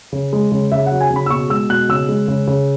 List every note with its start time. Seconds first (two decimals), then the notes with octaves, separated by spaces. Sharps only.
0.13 C#3
0.33 G#3
0.52 C#3
0.72 C#3 E5
0.86 F#5
0.92 F#3
1.01 G#5
1.11 C#3
1.16 B5
1.26 E6
1.30 B2 C#6
1.50 G#3 E6
1.69 B2 F#6
1.89 C#3 E6
2.09 G#3
2.28 C#3
2.48 C#3